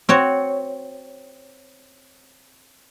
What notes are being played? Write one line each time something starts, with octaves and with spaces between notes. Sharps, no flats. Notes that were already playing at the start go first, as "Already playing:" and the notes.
C4 F#4 C#5